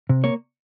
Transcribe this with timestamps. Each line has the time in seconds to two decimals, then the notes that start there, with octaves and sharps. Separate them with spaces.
0.09 C3
0.24 A#3 C#5